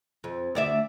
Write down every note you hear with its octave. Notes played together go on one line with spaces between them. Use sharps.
F2
D2 D5 E5